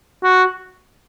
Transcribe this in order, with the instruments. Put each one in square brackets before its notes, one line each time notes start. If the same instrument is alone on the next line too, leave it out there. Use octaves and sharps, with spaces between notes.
[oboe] F#4